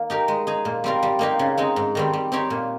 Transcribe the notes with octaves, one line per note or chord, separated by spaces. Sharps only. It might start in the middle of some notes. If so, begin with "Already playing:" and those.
Already playing: D#3 A#3
D#4 G4 A#4
G#3
D#4 G#4
A#2
G3 C4 F4 A#4
G3
A#3 D#4 G4 C5
C#3
G#3 C4 D#4
G#2
D#3 G3 C4
G3
C4 D#4 G4 C#5
A#2